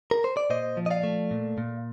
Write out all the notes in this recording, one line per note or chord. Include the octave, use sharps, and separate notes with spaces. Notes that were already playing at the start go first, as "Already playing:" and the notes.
A#4
C5
D5
A#2 C5 D#5
F3
D#5
D5 F5
A3
A#2
A#2